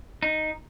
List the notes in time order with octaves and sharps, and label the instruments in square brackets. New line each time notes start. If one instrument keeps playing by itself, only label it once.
[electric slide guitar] D#4